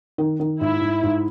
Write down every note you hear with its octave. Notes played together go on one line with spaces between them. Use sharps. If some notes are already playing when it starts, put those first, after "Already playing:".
D#3
D#3
G#2 E4
G#2
G#2